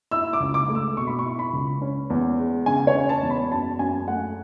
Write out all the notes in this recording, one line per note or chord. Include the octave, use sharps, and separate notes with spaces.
E4 E6
D6
C#2
D6
A3
E6
B2 C#6
B5
C#6
E4
B5
C#2
C#4
E2
G#3
C#3 G#5
C#5
C#4
A5
E2
B5
F#2 A5
F#2 G#5
A3 F#5